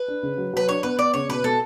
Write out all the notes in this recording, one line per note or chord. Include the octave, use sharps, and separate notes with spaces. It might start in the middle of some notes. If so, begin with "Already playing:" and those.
Already playing: B4
D4
C#3
F#3
F#3 B4
D4 C#5
B3 B4
B3 D5
C#3 C#5
B2 B4
B2 A4